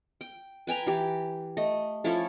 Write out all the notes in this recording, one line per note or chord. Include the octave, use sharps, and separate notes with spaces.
G5
B4 G5 G#5 A#5
E3 G4
A3 D#5
F3 C#4 E4 A4